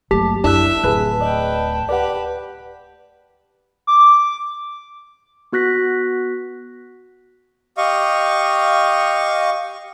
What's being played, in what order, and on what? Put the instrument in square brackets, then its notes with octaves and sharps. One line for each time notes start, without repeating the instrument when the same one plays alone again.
[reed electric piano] G2 A3 A5 [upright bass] F#3 A#3 [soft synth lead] G4
[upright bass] F#2 [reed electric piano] D4 E4 F#6 [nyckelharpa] E5 [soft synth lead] A5
[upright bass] D1 F#2 [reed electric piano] G#4 B4 F#6
[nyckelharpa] B4 G5 [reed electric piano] D5 D#5
[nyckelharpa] G4 B4 [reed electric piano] D5 F#5
[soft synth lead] D6
[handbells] B3 F#4 F#6 A#6 B6
[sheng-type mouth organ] G4 D#5 F5 C#6